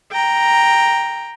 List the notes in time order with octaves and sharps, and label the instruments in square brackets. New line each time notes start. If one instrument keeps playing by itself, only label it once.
[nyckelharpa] G5 A#5